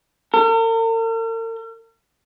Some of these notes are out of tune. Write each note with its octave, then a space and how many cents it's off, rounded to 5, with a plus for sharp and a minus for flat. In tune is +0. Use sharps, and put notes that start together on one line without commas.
A#4 -45